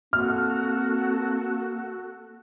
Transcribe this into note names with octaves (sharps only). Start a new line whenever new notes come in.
A#3 C4 F#4 A4 F6